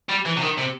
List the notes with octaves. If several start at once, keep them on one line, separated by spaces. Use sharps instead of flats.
G3
E3
C3
D#3
C3